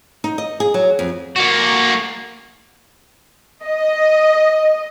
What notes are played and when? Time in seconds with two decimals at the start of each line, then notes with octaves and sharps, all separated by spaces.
0.24 D#4
0.38 D#5
0.60 G#4
0.74 F#3
0.99 F2
1.36 A#3 F#4
3.66 D#5